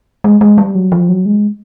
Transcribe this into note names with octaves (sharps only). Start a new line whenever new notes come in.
G#3
G#3
G3
F#3
F3
F#3
G#3